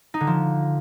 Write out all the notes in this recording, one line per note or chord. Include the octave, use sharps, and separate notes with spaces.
D#4
D3
F3